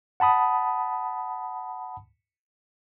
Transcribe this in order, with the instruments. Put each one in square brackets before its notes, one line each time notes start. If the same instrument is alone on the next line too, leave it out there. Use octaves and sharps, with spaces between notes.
[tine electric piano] F#5 A5 B5 D#6